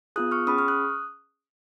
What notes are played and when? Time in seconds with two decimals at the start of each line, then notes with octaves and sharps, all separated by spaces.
0.16 B3 F4 G#4 D#6 F#6
0.31 C#6 F6
0.47 C#4 G#4 B5 D#6
0.58 C#6 F6
0.68 D#6 F#6